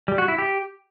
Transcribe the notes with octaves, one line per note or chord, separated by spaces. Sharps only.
G3
F#4
E4
G4